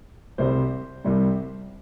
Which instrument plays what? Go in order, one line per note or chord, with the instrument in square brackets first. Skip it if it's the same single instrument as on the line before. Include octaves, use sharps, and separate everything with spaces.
[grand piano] C2 C3 G3 C5
C2 C3 G3